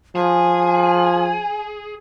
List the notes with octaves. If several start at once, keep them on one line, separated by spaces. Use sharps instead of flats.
F3 G#4 G#5